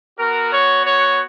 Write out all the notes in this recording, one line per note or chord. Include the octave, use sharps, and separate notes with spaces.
B3 F#4 A#4
C#5
C#5